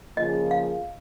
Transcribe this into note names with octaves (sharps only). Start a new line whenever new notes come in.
C#3 F3 A#3 F4 G#4 D#5
F5